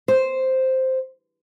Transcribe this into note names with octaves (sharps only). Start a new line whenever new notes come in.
C5